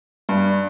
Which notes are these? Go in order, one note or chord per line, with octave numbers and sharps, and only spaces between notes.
G2